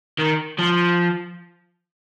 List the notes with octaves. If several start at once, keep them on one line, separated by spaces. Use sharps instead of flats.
D#3
F3